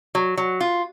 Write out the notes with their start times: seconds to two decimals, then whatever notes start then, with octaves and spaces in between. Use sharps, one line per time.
0.15 F#3
0.37 F#3
0.60 F4